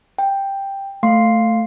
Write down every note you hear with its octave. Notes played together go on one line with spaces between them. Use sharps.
G5
A3 F5 C6 C7